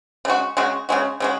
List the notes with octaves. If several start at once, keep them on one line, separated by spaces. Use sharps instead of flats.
C#3 G#3 F#4
C#3 G#3 F#4
C#3 G#3 F#4
C#3 G#3 F#4